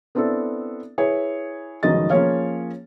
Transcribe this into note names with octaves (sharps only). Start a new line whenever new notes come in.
B3 C4 D4 E4 A4
E4 G#4 B4 C#5
F1 C#2 D#3 F#3 D#5 A6
F3 A#3 C#4 G#4 C#5 F5